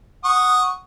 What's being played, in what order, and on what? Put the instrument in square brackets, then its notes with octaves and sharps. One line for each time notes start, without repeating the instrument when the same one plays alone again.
[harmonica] F#5 C#6 D#6